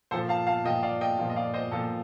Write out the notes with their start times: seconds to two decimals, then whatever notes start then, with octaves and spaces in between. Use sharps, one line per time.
0.11 A#2 F3 A4 C5
0.29 F5 A5
0.47 F5 A5
0.65 A#2 D#5 G5
0.69 F3
0.83 D5 F5
1.01 D#5 G5
1.19 A#2 F3
1.30 D#5
1.36 D5 F5
1.54 C5 D#5
1.71 A#2 F3 A4